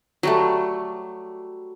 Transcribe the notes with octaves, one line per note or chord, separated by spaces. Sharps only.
F#3 G3 A3